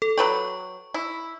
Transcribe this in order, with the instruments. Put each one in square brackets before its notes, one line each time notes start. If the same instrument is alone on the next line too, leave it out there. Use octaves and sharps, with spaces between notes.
[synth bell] A4
[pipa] F#3 B4 G5 [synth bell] C#6
[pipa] E4